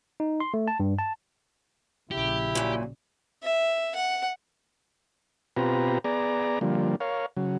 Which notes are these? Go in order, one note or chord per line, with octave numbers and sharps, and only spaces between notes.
D#4
C6
A3
A5
G2
A5
A#1 C#3 E4 G4
F#2 A#2
E5
F#5
B2 C4 F4 G4 B4 A#5
B3 G#4 D5 A#5
D3 F3 G3 A#3
A#4 C#5 F5
C#3 F#3